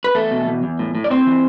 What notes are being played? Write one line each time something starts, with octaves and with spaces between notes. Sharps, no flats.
B4
E2 A3 A4
B2
E2
E2
A2
A2
D5
A2 C4 C5
E3